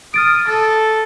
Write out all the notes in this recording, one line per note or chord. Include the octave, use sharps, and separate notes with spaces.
D#6 F6 A6 D7
A4 A6